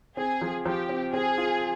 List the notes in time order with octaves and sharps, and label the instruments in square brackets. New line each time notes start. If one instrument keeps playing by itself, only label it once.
[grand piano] C4 [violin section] G#4
[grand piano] F3
[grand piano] F3 [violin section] G4
[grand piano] C4
[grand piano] C4 [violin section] G#4
[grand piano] F4